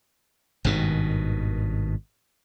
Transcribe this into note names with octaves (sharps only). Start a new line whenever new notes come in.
G#1 G2 B2 D#3